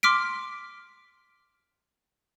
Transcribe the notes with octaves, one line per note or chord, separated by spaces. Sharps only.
C6 D6 F6 B6 D7